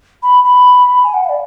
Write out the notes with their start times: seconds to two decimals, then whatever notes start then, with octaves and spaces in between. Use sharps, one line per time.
0.23 B5
0.44 B5
1.04 G#5
1.14 F#5
1.25 F5
1.29 D5